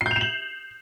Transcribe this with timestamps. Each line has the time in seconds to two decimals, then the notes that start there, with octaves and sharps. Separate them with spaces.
0.01 C7
0.06 G6
0.11 F7
0.16 E7
0.21 F#7